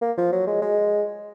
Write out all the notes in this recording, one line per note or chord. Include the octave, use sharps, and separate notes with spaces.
A#3
F3
F#3
G#3
G#3